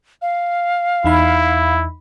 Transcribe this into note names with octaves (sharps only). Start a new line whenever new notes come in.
F5
E2 D#4 E4 B5